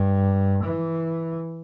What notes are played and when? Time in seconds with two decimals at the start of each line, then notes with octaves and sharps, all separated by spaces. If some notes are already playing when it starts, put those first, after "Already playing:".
Already playing: G2
0.63 E3